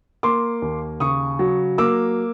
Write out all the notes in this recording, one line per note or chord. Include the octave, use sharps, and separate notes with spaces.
A#3 C6 D6
D#2
C#3 C#6 D#6
F#3
A#3 D6 E6